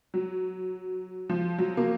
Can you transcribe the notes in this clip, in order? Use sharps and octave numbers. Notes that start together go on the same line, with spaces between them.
F#3
F3
F#3
A#3